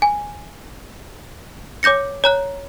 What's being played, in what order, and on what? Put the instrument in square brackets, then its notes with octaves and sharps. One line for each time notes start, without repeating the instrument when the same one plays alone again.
[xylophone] G#5
C#5 D6 G6 A#6 C#7
C#5 A#5 F#6